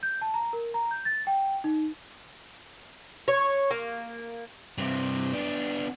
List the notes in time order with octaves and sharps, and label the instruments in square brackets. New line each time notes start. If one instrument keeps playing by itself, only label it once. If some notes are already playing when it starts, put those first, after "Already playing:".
[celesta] G6
A5
A#5
A#4
A#5
G6
A6
G5
D#4
[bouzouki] C#5
A#3
[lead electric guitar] G2 C3
B3 D4